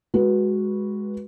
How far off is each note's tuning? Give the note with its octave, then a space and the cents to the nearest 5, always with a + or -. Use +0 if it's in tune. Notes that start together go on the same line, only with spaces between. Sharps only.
G#3 +0 F#4 +0 B4 -20